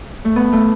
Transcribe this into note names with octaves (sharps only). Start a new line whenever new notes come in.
A3
B3
A3